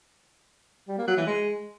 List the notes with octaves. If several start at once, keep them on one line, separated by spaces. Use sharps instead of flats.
G3
A#3
F#3
E3
G#3